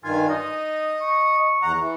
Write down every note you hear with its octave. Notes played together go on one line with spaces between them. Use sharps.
G2 D#3 F4 G#5
D#4 D#5
C#6
E2 F#5 A#5
E3